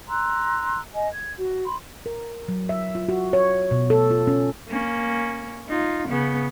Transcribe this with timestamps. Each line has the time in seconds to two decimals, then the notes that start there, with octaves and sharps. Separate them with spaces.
0.09 A#5 C6 E6 F#6
0.95 D#5 G#5
1.13 G#6
1.37 F#4
1.65 B5 C6
2.06 A#4
2.48 F#3
2.69 E5
2.95 F4
3.09 F#4
3.33 C#5
3.71 B2
3.90 A4
4.10 F4
4.27 C#4
4.69 A#3 C#4
5.69 D#4 F4
6.08 C#3 B3